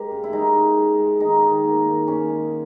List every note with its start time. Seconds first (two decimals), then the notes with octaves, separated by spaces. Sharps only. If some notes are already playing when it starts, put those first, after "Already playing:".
Already playing: G#3 G4 A#4
0.11 C#3
0.23 E4
0.33 G#3 D#4
0.55 C#3
0.77 G#3
0.99 G#3
1.20 D#3 D#4
1.43 D#3
1.64 A#3
1.86 D#3
2.07 G#3 C#4
2.30 G#3